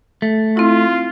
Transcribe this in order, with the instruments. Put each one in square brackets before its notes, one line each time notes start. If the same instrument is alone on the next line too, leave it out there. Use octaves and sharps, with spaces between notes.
[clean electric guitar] A3
[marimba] C4 E4 [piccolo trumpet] F4